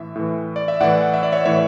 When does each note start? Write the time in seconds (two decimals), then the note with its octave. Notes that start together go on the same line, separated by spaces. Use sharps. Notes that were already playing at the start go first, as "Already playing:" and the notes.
Already playing: A2 E3 E5
0.15 A2 E3
0.56 D5
0.68 E5
0.80 A2 E3 D5 F#5
1.14 E5
1.23 D5
1.32 C#5 E5
1.45 A2 E3 C#5 E5